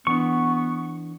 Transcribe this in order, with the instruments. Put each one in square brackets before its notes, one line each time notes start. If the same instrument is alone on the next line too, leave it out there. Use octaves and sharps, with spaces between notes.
[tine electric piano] E3 D4 [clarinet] B3 [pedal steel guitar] C#6